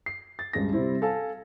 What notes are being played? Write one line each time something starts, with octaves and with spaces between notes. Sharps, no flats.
C7
A6
C#2 G2 C#3 G#4 A#6
C3 G3 C4 E4
A4 F5 G#5 A5